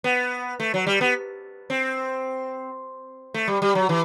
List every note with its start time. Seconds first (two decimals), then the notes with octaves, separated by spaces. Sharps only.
0.04 B3
0.60 A3
0.74 F#3
0.87 G3
1.01 B3
1.70 C4
3.34 A3
3.48 G3
3.62 G3
3.75 F#3
3.89 E3